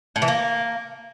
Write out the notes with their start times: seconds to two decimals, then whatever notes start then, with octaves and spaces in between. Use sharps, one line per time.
0.16 A2
0.22 E3
0.28 A#3